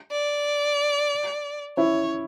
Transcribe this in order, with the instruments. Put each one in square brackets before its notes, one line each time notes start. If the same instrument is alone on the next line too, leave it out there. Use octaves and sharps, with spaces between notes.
[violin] D5
[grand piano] C#4 E4 [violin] C#5